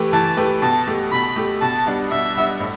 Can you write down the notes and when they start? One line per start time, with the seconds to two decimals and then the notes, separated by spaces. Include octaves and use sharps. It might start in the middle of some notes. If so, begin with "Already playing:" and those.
Already playing: E3 A3 G4 B4
0.13 E3 A5
0.37 A3 G4 B4
0.62 B2 A5
0.87 A3 G4
1.12 B2 B5
1.36 A3 G4
1.62 B2 A5
1.86 G3 B3 D4
2.11 B2 E5
2.35 G3 B3 D4
2.60 A2